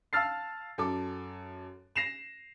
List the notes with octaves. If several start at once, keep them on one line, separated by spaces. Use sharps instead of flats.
F5 A5 E6 F6 A6 C7
F#2 A4 D6
A#6 C7 E7 F7